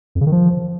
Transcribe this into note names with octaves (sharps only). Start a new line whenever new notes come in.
F2
C#3
D#3
F3